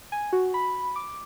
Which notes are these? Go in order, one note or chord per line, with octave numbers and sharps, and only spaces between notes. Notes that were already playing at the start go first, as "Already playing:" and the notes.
G#5
F#4
B5
D6